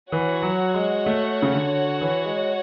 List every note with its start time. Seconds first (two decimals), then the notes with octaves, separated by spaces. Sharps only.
0.12 E3 F#4 C#5 F#5
0.43 F#3
0.74 G#3
1.06 A3
1.42 C#3
1.53 D3
2.01 E3
2.24 G#3